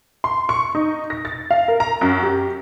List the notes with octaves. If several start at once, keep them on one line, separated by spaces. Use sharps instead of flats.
C6
C#6
D#4
A#6
A6
F5
A#4
A#5
F#2
G4